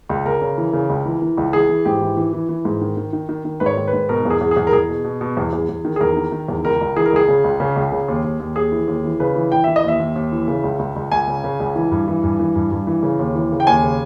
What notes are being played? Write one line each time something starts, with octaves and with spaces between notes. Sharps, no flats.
C#2
C#3 A#4
C#3
E3
C#3
C#2
E3
E3
C#2
E3 G#4
E3
G#2 G4
E3
E3
E3
E3
G#2
D#3
D#3
D#3
D#3
D#3
G#2 B4
C#5
D#3
B4
G#2
B2 A#4
E2
G#4
E2
G#4
E2
A#4
E2 G#4
B2
B2
B2
E2
E2
E2
D#3
G#4
E2 A#4
D#3
D#3
E2
C#2 A#4
C#2
E3 G#4
A#4
C#2 G#4
C#3
C#2
C#3
C#2
C#3
D#2
D#2
D#2
D#2 G#4
E3
D#2
E3
C#3 B4
E3
E3 G5
E3 E5
D#5
D#2 E5
D#2
D#2
E3
C#3
C#2
C#2
C#2
C#2 G#5
C#3
C#3
C#2
E3
G2
E3
G2
E3
G2
G2
E3
C#3
D#2
E3
C#3
G5
D#2 G#5
C#3